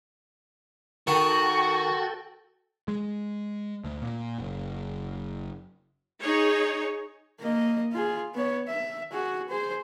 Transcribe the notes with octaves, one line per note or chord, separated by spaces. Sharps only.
D#3 F#4 A4 G5 C#6
G#3
D2
A#2
F#1
D#4 G#4 C#5
A#3 D#5
F4 G#4
B3 C#5
E5
F#4 G#4
G#4 C5